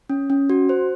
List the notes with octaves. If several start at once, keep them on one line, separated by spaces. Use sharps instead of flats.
C#4
C#4
F#4
C5